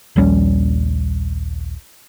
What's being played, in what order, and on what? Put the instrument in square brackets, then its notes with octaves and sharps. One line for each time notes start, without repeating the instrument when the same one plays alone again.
[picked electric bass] A#1 D#2 G3 C#4